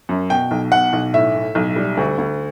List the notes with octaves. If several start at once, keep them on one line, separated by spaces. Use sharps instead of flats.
F#2
B2 G5
B1
B2 F#5
B1
A2 E5
A2
B1
G3
D2
D2